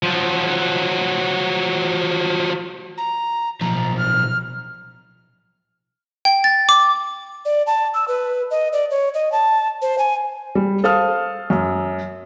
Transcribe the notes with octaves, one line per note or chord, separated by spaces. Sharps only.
F3 F#3
A#5
B1 F3 A#5
F6
G5
A6
D6
D5
A5
E6
B4
D#5
D5
C#5
D#5
A5
C5
G#5
G3
A4 C5 F5 D#6 F6
F#2